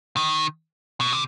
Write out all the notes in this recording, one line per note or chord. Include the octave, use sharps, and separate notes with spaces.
D#3
B2
C3